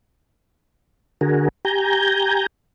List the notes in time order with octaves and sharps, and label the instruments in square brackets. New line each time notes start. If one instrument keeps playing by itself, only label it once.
[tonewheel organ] D3 F#4 G#4 A#4
G4 G#5 A#5 G6